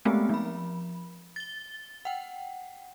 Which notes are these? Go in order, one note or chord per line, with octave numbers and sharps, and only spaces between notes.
G#3 A3 B3 C4 G4
F3 B5
A6 G7
F#5 G5